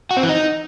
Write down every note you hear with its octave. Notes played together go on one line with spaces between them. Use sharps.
F#4
C4
E3
D#4